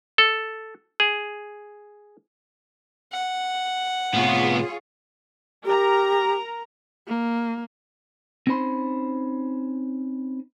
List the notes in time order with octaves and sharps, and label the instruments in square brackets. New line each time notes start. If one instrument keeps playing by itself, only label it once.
[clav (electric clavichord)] A4
G#4
[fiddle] F#5
[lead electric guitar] A2 C3 [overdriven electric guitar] B3 [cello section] F4 G#4 C#5
[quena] G4 [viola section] A#4 A#5
[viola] A#3
[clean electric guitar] C4 C#4 D#4 C5 B5 C6